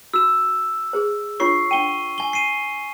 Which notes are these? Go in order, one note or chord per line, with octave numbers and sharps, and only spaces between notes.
F#4 E6 E7
G#4 C5
D4 F4 C#5 C#6 C7
D4 F#5 G5 D#7 G7
G#5 G7
C7 D#7